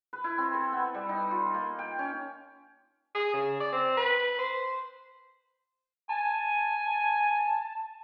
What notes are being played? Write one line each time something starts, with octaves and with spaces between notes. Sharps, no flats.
B4
E4
C4
A4
B3
G3
D#4
F4
A#3
G5
C#4
G#4
C#3
D5
C4
B4
C5
G#5 A5